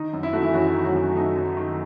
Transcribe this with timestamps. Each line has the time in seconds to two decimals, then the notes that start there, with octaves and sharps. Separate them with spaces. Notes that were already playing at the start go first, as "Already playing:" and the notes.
Already playing: D#3 D#4
0.13 F#2
0.23 E4
0.33 A3 F#4
0.42 E3 E4
0.54 F#2 F#3 F#4
0.75 D#3
0.85 F#3 F#4
0.95 F#2
1.16 A3 D#4
1.36 F#2
1.57 D#3